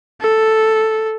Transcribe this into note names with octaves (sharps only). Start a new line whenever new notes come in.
A4